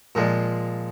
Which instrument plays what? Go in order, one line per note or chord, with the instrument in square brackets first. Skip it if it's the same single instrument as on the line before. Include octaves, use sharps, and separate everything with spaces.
[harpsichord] A#2 F3 G#3